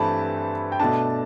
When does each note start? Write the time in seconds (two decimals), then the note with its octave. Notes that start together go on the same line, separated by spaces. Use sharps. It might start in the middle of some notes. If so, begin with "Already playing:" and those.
Already playing: G2 E3 A3 C4 A5 B5
0.72 G5
0.80 B2 A3 D4 A5